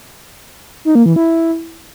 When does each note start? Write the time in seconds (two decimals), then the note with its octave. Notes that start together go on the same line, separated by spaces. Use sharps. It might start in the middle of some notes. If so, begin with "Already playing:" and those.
0.85 D#4
0.95 A#3
1.06 E3
1.16 E4